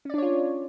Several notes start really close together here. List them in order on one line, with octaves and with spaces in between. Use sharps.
C#4 D5 D4 C#5 F4